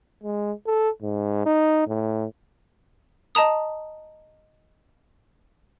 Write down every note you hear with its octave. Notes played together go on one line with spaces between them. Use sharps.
G#3
A4
G#2
D#4
A2
D#5 A5 A#5 D#6